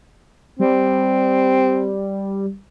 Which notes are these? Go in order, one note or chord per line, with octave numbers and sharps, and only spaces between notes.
G3 C4